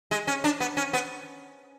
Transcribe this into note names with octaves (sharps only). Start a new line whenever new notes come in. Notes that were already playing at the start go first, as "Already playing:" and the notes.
G#3
C#4
D4
B3
C#4
B3